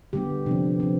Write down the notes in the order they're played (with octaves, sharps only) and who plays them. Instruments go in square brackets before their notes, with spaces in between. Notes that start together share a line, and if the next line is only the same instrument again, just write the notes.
[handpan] D3 G3 B3 G4
C3 F3 C4 D4
G3 C4